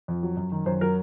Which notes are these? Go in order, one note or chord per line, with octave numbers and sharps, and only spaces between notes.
F2
F#3
F#2
D#3
F#2 C5
F#3 A#4